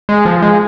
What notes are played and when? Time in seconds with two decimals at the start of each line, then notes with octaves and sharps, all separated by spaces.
0.09 G#3
0.25 F3
0.42 G#3